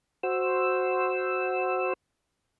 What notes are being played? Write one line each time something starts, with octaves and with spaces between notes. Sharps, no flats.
F#4 C5 E6